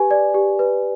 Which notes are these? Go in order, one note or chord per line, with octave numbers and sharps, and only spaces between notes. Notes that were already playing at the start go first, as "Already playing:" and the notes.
Already playing: G4 B4 G#5
D5
G4
B4